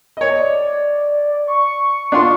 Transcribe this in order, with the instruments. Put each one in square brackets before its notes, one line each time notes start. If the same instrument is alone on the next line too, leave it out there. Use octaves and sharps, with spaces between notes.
[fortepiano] C#5 D#5
[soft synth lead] D5
C#6
[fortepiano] D4 F4 C6